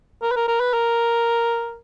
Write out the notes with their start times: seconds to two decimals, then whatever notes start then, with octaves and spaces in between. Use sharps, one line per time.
0.22 A#4
0.31 B4
0.36 A#4
0.48 A#4
0.60 B4
0.74 A#4